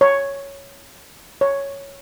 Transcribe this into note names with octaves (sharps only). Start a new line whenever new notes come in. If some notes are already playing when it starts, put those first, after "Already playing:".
C#5
C#5